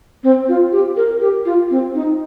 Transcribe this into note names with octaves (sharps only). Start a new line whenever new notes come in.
C4
F4
G4
A#4
G4
F4
C4
D#4